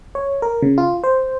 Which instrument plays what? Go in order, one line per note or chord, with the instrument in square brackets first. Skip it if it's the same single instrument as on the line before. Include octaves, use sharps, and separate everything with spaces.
[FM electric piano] C#5
A#4
C#3
F4
C5